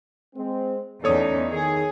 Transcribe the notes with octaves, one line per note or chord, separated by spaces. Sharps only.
G#3 C4
E2 A3 C#4 D#4 A4 C#5 D5 D#6
D#3 G#4